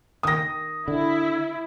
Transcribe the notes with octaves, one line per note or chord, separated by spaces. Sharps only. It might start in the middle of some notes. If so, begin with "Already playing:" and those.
D#3 G5 D#6 A#6
D3 E4